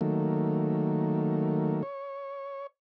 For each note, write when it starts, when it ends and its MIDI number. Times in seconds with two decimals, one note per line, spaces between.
0.01 1.83 51
0.01 1.83 54
0.01 1.83 57
0.01 1.83 58
1.83 2.67 73